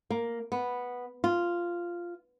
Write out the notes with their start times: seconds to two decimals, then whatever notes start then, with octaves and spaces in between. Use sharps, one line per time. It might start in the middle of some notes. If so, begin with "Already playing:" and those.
0.10 A#3
0.52 B3
1.24 F4